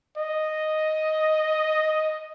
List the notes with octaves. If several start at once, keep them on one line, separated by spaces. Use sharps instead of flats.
D#5